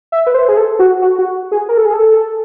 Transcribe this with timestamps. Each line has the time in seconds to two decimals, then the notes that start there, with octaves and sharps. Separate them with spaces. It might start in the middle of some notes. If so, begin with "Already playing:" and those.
0.12 E5
0.27 B4
0.34 C5
0.48 G#4
0.57 A4
0.79 F#4
1.02 F#4
1.19 F#4
1.52 G#4
1.69 A#4
1.77 A4
1.85 G#4
1.94 A4